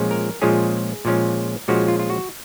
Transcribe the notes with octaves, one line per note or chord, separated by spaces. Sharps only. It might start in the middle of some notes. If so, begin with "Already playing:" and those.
Already playing: A#2 F3 G#3 C#4
A#4
A#2 F3 G#3 C#4 G#4
A#2 F3 G#3 C#4
A#2 F3 G#3 C#4 F#4
F4
F4
F#4